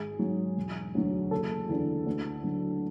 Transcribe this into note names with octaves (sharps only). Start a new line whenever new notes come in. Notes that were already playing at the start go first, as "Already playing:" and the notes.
Already playing: G#1 G#4
G#2 F#3
E1
D2 D3 F#3
F#1 A4
E2 D3
D2
D3 F#3